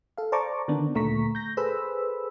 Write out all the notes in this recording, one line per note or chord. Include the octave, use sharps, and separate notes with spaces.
A4 F5
C5 D5 A5 A#5 C#6 D6
D3 D#3 B3 D4
D2 A#2 A3 A#5 C#6 B6
G6 A#6
G#4 A4 B4 C5 B5 E6